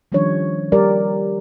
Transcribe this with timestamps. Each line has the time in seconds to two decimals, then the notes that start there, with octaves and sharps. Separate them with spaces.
0.12 D#3 F3 G3 C#4 D4 C#5
0.72 G3 G4 A#4 D5